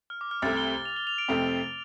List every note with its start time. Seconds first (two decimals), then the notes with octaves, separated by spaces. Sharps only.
0.10 F6
0.21 D6
0.31 F6
0.42 C2 C3 A3 A6
0.57 G7
0.85 F7
0.97 G7
1.07 F7
1.18 D7
1.28 F2 C3 A3 C4